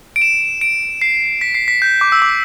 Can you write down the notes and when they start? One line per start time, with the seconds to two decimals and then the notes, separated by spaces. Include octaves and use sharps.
0.16 D7
0.22 E7
0.61 D7
1.02 C7
1.41 B6
1.54 C7
1.68 B6
1.82 G6
2.01 D6
2.12 E6
2.22 D6